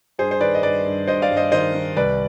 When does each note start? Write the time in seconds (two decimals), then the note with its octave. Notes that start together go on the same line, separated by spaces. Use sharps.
0.19 G2 G#4 C5
0.31 C5
0.40 D#3 B4 D5
0.55 D#5
0.63 G2 B4 D5
0.86 G2
1.07 G2 C5 D#5
1.22 D5 F5
1.30 G2
1.37 C5 D#5
1.52 D#3 C5 D#5
1.75 D#3
1.97 C2 B4 D5